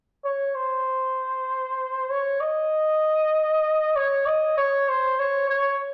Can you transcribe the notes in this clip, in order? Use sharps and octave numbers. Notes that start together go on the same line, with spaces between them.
C#5
C5
C#5
D#5
C#5
D#5
C#5
C5
C#5
C#5